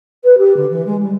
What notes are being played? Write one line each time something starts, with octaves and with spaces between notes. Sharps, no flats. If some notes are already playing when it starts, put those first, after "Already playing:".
B4
G4
D3
E3
G#3
G3